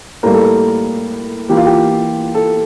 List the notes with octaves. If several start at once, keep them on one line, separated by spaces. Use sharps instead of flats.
A2 G3 A#3 A#4
A4
A#4
E3 A#3 G4
F4
G4
A4